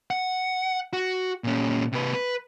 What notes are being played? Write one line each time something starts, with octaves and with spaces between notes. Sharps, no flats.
F#5
F#4
A#2 C#4
C3 B4
B4